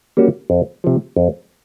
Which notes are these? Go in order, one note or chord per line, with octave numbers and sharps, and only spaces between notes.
G3 A#3 C#4 F#4
F2
C3 F3
F2